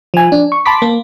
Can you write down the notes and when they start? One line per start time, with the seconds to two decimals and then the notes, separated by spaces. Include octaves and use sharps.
0.14 F3 G#5
0.32 D4
0.52 C#6
0.66 A5 B5 C6 D6 B6
0.82 A#3